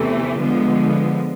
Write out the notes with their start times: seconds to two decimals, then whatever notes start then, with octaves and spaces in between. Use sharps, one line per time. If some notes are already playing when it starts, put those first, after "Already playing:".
Already playing: E2 C3 E3 A3
0.41 D3 F3 G#3 B3